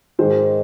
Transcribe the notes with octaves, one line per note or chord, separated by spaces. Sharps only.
G#2 D#3 G#3 C5